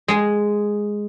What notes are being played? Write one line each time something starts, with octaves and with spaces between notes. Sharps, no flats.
G#3